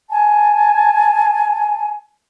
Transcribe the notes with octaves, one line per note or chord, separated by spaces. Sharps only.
G#5 A5